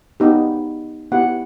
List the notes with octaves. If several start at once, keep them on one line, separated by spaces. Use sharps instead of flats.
B3 D#4 G4
B3 E4 G4 F#5